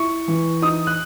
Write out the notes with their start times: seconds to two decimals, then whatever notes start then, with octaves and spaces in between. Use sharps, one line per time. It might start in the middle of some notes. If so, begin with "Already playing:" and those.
Already playing: E4 C#6
0.28 E3
0.62 D#4 D#6
0.87 F#6